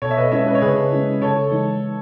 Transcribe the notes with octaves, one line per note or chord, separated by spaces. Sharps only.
B2 A4 C#5
E5
B4 D#5
G#3 C#4 E4 C#5 E5
B4 D#5
C#5
C#3 G#4 B4
G#3 C#4 E4
C#3 A4 C#5
E3 G#3 D#4